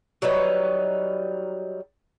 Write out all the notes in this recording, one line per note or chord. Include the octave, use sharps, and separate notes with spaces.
F#3 G3 D#4 B4